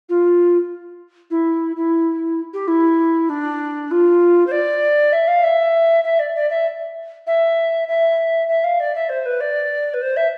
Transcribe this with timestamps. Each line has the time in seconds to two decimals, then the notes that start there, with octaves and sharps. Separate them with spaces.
0.09 F4
1.30 E4
1.76 E4
2.53 G4
2.67 E4
3.29 D4
3.91 F4
4.46 C5
4.51 D5
5.12 E5
5.27 F5
5.43 E5
6.04 E5
6.19 D5
6.34 D5
6.49 E5
7.27 E5
7.88 E5
8.48 E5
8.64 F5
8.79 D5
8.94 E5
9.09 C5
9.25 B4
9.40 D5
9.93 B4
10.01 C5
10.16 E5